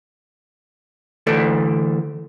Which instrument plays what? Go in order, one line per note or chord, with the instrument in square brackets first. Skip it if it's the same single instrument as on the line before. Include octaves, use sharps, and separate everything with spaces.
[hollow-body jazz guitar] D3 E3 A3 A4 D5